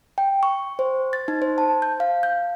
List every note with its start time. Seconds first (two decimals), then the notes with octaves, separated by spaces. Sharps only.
0.18 G5
0.43 C#6
0.79 C5
1.13 A6
1.28 D#4
1.42 C5
1.58 A5
1.82 G6
2.00 F5
2.23 G6